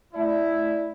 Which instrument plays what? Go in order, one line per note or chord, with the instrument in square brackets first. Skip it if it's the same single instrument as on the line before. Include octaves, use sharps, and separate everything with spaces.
[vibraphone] A3 D5 [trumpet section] E4